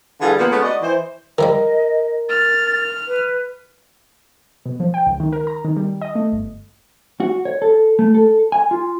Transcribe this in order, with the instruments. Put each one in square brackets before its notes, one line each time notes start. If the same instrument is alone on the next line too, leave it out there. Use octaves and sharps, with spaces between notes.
[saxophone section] D3 E3 G3 F4 G#4 A4
A#2 F3 A#3 B3
G#3 A3 B3 C#4
F#4 D5 D#5
E3 C5
[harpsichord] D#3 F3 G3 [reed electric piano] A#4 [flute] D#5
[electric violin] F6 [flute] A6
[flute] B4
[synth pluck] B2
F3
G5
C#2
D#3
A#4
A#5
D#3
G3
D#5
A3
G1
[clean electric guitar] F#4
C#5
A4
A3
A4
G#5
F4